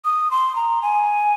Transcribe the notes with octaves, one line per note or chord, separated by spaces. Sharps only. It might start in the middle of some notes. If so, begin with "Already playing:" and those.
D#6
C6
A#5
G#5